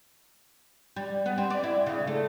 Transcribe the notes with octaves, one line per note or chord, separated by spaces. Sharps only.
G3
B3
C4
D5
E4
C#3
A3